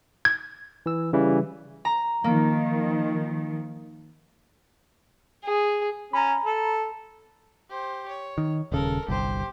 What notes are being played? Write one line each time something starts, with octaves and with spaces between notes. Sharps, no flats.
G#6
E3 E6
C#3 E3 G3
A#5
D#3 F3 A#3
G#4
C#4 A#5 B5
A4
G4 C5
C#5
D#3
D#1 C#3 A4 A#4
G1 C2 G4 C5